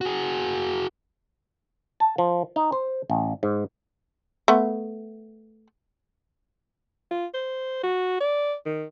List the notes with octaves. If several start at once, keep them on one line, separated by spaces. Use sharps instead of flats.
F#4 G#4
A5
F3
D#4
C5
A1
G#2
A3 B3
F4
C5
F#4
D5
D#3